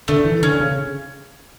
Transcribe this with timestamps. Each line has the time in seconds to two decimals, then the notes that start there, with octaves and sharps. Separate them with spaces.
0.08 D3 A3
0.25 E3
0.42 D3 C#4
0.60 C#3